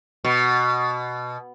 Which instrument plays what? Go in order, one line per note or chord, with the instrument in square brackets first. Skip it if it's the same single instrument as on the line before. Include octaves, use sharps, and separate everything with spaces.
[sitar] B2